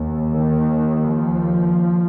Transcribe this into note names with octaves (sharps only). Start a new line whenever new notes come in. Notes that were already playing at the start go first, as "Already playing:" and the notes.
Already playing: D#2
D#3
F3